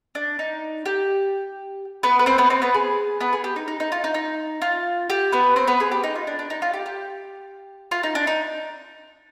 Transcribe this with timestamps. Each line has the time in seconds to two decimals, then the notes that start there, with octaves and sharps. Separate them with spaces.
0.15 D4
0.39 D#4
0.86 G4
2.03 B3 B4
2.19 B4
2.26 C4 C5
2.38 B3 B4
2.50 C4 C5
2.62 B3 B4
2.74 G#4
3.21 B3 B4
3.33 G#4
3.44 G4
3.56 D#4
3.68 D#4
3.80 D#4
3.92 F4
4.04 D#4
4.14 D#4
4.62 F4
5.10 G4
5.32 B3 B4
5.56 C4 C5
5.67 B3 B4
5.80 G#4
5.91 G4
6.03 D#4
6.15 F4
6.27 D4
6.39 D4
6.50 D#4
6.62 F4
6.73 G4
6.86 G4
7.91 F4
8.03 D#4
8.15 D4
8.27 D#4